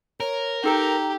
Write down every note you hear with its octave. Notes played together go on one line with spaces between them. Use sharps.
A#4 C#5
D#4 G4 A4 G5 A#5